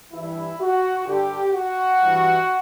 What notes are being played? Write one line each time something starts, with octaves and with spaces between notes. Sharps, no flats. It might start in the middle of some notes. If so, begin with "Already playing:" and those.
G2 E3 E4
F#4
G2 D3 G4
F#4
G2 E3